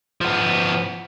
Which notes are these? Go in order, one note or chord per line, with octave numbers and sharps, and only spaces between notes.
F3 B3